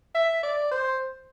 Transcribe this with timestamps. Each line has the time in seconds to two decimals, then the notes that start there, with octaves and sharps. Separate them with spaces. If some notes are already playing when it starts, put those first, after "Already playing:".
0.15 E5
0.43 D5
0.71 C5